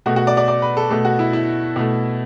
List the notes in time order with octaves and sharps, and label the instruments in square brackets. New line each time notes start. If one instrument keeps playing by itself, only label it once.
[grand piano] B2 A3 F#4
F#4
D5
D5
D5
B4
A4
B2 A3 A4
F#4
E4
E4
B2 A3